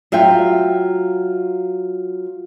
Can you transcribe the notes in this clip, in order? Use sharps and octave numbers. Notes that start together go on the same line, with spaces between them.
F#3 F4 E5 G5